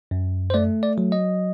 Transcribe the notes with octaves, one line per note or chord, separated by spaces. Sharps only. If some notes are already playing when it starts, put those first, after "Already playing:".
F#2
C5
A3 D5
D5
F#3
D#5